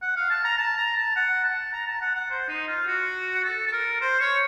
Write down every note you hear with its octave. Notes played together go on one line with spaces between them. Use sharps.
F#5
F5
A5
A#5
A5
A#5
A5
F#5
A5
A#5
A5
F#5
F#5
C5
D#4
F4
F#4
A4
A4
A#4
C5
C#5